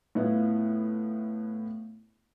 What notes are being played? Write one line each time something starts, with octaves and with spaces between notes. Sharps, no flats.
A2 B3 E4 F4